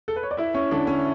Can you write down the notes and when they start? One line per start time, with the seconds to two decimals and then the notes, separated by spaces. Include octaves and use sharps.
0.08 A4
0.16 B4
0.23 C#5
0.31 D5
0.37 E4 E5
0.54 C#4 C#5
0.71 D3 D4
0.87 C#4